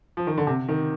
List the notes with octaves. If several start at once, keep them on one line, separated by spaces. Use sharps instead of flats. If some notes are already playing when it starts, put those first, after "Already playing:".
F3
D#3
D3
C3
D#3